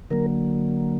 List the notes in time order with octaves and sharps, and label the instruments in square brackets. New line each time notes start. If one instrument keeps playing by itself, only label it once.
[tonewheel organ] D3 F#3 A#3 A#4